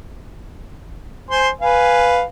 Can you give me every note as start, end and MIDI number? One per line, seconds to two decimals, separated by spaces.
1.30 1.49 72
1.30 1.49 80
1.30 1.49 84
1.61 2.23 71
1.61 2.23 77
1.61 2.23 80